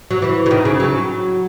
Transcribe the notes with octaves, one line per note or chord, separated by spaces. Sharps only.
F#3
E3
C#3
D#3
C#3
F#3